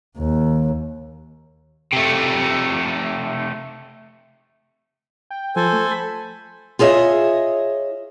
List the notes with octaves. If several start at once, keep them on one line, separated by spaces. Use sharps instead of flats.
D#2
C3 A3
G5
F3 A4 C5 G#5
A3
B5
F4 G#4 C#5 D#5 E5